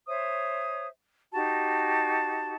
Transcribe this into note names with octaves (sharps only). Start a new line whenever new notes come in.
C5 C#5 E5 D#6
D#4 F#4 G4 A5